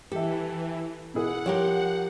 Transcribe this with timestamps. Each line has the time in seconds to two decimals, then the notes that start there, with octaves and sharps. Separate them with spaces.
0.12 E3 G4 A4 E5
1.14 B2 E4 G#4 F#5
1.46 F3 G4 A#4 C#5